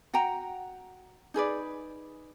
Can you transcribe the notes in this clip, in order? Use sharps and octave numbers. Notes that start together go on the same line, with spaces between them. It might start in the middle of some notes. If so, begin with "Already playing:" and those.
F#4 F#5 G5 A#5
D#4 G#4 B4 D5